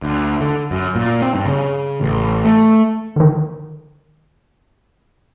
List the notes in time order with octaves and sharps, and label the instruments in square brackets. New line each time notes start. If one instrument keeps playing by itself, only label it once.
[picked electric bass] D2
D3
F#2
A#2
C4
G2
C#3
A1
A3
[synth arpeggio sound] D3 D#3